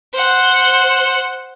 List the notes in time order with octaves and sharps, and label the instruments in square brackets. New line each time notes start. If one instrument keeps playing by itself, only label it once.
[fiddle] C5 F#5